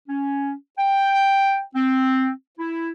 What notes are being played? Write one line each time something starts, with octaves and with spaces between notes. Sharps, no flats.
C#4
G5
C4
E4